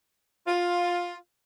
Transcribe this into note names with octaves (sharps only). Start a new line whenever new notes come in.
F4